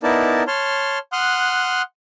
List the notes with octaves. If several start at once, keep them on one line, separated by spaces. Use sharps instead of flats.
B3 D#4 E4 A#4 D5 A5
C#5 A5 C6 F6
F#5 C6 D#6 F6 F#6